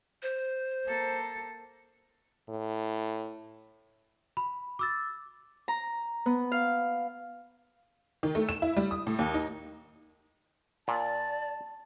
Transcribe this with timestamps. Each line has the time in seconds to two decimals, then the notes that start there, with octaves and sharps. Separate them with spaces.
0.23 C5
0.86 A#3 A4
2.49 A2
4.37 B5
4.79 D6 E6 A6
5.68 A#5
6.26 B3
6.52 F5
8.23 D#3
8.35 A3
8.49 E7
8.62 E4
8.77 G3
8.91 D#6
9.07 A2
9.19 D#2
9.34 D#4
10.88 A#2 D5 A5